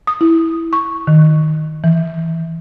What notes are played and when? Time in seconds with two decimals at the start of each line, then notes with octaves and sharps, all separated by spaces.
0.07 D#6
0.21 E4
0.73 C#6
1.07 D#3
1.84 E3